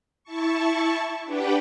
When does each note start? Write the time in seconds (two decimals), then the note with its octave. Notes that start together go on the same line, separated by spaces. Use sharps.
0.24 E4 A5 C#6
1.24 D4 G4 B4 F#5 G5